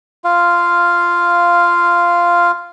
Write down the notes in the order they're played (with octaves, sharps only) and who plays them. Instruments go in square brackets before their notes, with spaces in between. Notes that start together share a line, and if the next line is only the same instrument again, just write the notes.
[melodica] F4 F5